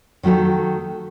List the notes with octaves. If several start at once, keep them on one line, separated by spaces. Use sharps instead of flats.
D#3 F#3 A3 G4 A4